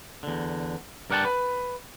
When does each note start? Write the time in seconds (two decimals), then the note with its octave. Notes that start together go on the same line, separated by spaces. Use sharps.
0.23 E2 D3
1.10 G2 A#4 D5 F#5 G5 A5
1.25 B4